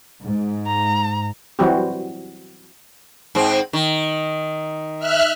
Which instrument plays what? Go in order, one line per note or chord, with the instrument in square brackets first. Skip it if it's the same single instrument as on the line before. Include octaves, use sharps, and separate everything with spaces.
[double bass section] G#2
[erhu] A#5
[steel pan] E3 F#3 G3 C4 F#4 G4
[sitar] G#2 C4
D#3
[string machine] E5 F6 F#6